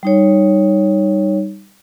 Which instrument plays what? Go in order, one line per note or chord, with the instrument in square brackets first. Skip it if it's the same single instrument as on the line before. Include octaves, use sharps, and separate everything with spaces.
[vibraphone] G3 D#4 C#5